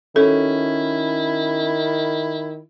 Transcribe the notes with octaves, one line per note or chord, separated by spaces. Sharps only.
D#3 C#4 E4 F#4 A4